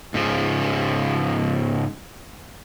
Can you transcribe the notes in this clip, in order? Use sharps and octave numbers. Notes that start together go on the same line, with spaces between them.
G#2 C#3 F3